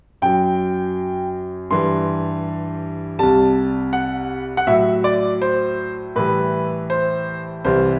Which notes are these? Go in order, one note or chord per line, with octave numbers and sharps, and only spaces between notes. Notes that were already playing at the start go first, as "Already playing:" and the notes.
F#2 F#3 G5
G2 E3 G3 C6
C2 C3 G3 A5
F#5
F#5
A2 F#3 E5
D5
C5
A2 E3 G3 B4
C5
C2 C3 E3 G3 C5